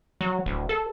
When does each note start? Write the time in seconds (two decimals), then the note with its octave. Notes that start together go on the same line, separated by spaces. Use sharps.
0.21 F#3
0.46 D1
0.69 A4